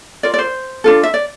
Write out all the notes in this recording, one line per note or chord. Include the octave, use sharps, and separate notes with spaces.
F4 A#4 D5
D5
C5
D4 F4 A4
E5
D5